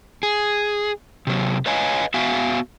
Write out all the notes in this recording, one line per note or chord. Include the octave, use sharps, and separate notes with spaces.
G#4
C3 F#3
B4 C#5 D#5 F5 G#5
B3 F#4 E5 F5 G#5